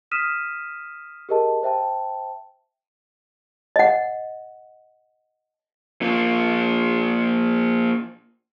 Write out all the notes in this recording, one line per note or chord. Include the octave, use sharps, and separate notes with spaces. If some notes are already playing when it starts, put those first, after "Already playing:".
D#6 F6 B6 D#7 E7
G4 G#4 A#4 D#5 A5
C5 E5 G5 A5
D#5 F#5
A#2 F3